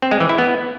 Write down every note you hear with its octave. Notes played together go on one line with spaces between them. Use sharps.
C4
G#3
E3
E4
B3